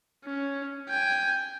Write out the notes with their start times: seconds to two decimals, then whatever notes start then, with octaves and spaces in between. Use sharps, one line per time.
0.25 C#4
0.89 G5 G#5